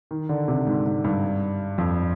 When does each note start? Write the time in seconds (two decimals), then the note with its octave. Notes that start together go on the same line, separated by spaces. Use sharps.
0.11 D#3
0.29 D3
0.48 C3
0.67 G#2
0.86 G#2
1.04 G2
1.78 F2